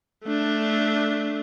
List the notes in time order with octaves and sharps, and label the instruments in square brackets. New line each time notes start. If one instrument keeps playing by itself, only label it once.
[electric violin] A3 D4